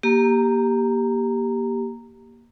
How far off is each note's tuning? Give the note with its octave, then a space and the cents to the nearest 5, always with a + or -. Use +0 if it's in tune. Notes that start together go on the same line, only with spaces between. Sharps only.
A#3 +20 G4 +0 A#5 -10